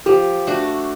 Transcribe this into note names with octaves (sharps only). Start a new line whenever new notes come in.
F3 G4
A3 D4 F#4